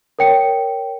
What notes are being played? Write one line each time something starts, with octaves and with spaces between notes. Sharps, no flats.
A#4 C#5 G5 C#7